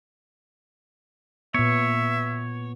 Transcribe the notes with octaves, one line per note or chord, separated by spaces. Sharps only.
A#2 B3 C#5 E5